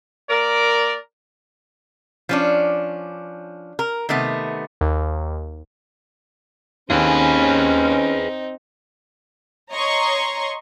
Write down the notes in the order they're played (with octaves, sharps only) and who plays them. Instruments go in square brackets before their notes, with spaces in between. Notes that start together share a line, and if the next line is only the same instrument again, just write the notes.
[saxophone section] A#3 A#4 [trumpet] D5
[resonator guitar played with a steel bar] F3 C#4 D4
A#4
C3 D#3 A3 B3
[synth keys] D#2
[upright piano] D#2 [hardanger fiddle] C4 D#4 [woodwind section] C#4 [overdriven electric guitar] G#4 B4
[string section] C#5 D#5 A#5 C6 C#6